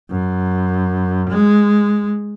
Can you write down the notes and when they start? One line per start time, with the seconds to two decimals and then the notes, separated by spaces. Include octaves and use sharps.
0.10 F#2
1.30 G#3